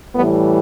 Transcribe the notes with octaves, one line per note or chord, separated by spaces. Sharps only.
A2 E3 G3 B3